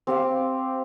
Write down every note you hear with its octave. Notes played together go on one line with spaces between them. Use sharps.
C4 G4 F5